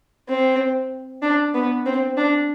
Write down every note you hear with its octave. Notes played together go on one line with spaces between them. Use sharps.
C4
D4
B3
C4
D4